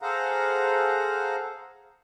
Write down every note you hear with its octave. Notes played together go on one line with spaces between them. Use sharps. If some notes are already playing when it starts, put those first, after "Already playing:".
G#4 A4 C5 F5 F#5 A#5